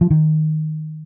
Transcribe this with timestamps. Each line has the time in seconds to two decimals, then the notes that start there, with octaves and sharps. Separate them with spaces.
0.01 F3
0.10 D#3